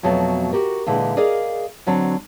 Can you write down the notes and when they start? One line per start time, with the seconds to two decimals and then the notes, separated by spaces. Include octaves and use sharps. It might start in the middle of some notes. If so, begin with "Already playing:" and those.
0.03 F2 B2 F#3 A3
0.53 F#4 G4 A#4
0.86 A#2 D3 E3 G#3
1.17 G#4 A#4 D5 D#5 F5
1.86 D3 F#3 C4 D4